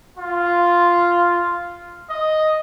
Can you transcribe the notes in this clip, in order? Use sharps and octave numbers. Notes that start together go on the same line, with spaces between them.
F4
D#5